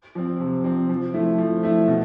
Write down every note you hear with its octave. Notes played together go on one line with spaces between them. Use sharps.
F3 C4
C3
F3 C4
F3
A3 E4
F3
A3 E4
B2